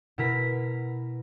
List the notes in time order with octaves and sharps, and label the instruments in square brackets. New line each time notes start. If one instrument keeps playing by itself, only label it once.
[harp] B2 E4 A#4 B6